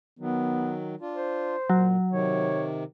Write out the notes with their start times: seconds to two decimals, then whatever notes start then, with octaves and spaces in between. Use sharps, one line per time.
0.19 D#3 F#3 B3
1.01 D4 F4
1.16 C5
1.70 A#2 F#3
2.11 C3 D#3 C#5